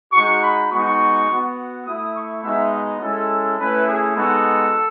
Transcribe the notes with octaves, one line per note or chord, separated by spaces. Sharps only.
G#3 D#4 F#4 C#6
B5
G#3 B3 D#4 F#4 C#6
B3 F#4
A3 E4 D#6
C#6
G#3 B3 D#4 F#4 E5
D#5
G#3 C#4 E4 A4
A3 C#4 E4 B4
G#4
G#3 B3 D#4 F#4 A4